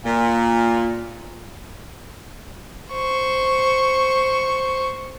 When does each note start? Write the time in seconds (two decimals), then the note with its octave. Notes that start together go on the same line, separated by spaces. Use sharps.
0.05 A#2
2.91 C5 C#6